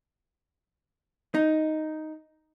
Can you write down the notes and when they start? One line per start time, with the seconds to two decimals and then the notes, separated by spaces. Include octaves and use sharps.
1.34 D#4